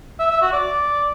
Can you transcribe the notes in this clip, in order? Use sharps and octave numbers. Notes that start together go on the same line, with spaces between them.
E5
E5
F#4
D5